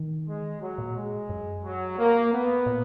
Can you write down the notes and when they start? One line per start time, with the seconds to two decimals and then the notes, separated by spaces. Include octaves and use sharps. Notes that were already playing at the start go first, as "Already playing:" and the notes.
Already playing: D#3
0.28 G#3
0.62 F#3
0.78 A#2
0.96 G#3
1.29 F#2
1.64 F#3
1.99 A#3
2.33 B3
2.66 A#2